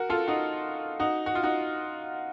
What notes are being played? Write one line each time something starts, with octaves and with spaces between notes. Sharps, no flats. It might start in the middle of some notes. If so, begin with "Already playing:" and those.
Already playing: F#4 A#4
F4 A4
D#4 F#4
D#4 F#4
F#4
F4
D#4 F#4